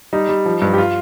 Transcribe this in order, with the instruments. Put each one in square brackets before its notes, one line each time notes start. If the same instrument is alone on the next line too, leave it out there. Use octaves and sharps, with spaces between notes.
[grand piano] G3 D#4
G3
F3
G2
G4
F4